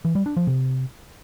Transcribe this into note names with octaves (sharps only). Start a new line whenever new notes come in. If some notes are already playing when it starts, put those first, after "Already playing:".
E3
G3
D4
F3
C3